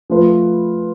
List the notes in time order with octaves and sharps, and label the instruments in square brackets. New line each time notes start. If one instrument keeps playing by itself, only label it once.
[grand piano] F3 A3 F4 B4